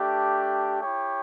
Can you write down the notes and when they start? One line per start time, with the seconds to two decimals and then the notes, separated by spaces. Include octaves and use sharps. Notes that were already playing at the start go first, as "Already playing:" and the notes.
Already playing: A3 D4 G4
0.81 E4 G4 C#5 G5